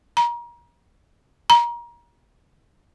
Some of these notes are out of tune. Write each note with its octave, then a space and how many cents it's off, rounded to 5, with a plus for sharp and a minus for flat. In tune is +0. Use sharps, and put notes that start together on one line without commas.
A#5 +35
A#5 +30